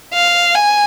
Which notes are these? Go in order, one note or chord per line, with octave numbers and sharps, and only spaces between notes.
F5
G#5